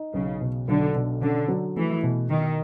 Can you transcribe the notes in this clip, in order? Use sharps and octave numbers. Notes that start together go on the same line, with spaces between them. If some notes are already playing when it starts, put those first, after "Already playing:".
Already playing: D#4
B1 C#3
B2
B1 D3
B2
D3 C#4
F#3
E3 A3
B2
B2 D#3